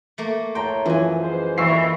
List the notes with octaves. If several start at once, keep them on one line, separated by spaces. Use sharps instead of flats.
A3 A#3
A2 E4 C#5 G5 A5 A#5 C6
F#2 E3 F3 G#5
G#3 B4 C5
F2 A#2 D#3 E3 C#6 E6 C7